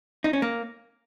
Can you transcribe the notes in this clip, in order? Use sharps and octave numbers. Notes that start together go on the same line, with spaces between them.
D#4
C#4
A#3